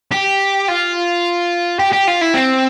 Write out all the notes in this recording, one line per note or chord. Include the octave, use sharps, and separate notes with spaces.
G4
F4
G4
G4
F4
E4
C4